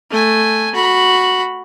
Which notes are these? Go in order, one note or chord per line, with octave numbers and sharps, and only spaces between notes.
A3 G#5
F#4 B5